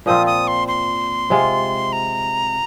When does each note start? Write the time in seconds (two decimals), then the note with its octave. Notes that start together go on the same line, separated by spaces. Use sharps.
0.06 A#2 F3 C4 F4 D#6
0.27 D#6
0.48 C6
0.68 C6
1.30 C3 G#3 F4
1.93 A#5